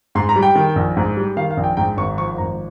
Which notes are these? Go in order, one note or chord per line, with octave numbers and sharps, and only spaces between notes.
G#2 C6
A#5
G3
G5
D#3
A#1
G#2
G3
D#3 F5
F5
A#1
G5
G#2 G5
G#1 C#6
F3 C#6
G#1 A#5